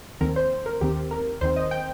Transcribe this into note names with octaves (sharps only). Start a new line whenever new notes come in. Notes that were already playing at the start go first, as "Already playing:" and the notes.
D#2 D#3 C4 A#4
C5
A#4
D#2 D#3 C4 G4
A#4
D#2 D#3 C4 C5
D#5
G5